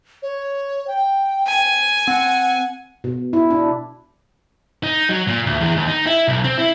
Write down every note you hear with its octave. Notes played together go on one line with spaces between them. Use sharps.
C#5
G5
G#5
C4 F#5
B2
E4
D4
D#4
F#3
A#2
D2
E2
D#2
D#4
E4
B1
C4
E4